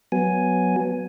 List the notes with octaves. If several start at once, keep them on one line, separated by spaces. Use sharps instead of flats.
F#3 B3 G#5